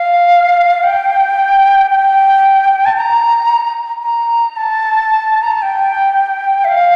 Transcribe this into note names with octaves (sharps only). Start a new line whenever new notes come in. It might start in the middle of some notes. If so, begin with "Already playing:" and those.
Already playing: F5
G5
G5
A5
A#5
A#5
A5
A#5
A5
G5
E5
F5